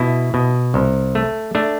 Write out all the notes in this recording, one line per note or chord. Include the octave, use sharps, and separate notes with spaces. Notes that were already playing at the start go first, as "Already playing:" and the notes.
Already playing: B2 E4
B2
C2
A3
A3 D4